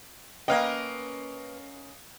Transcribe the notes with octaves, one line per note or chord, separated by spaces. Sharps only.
A#3 C#4 A#4 B4 D#5 F5 G5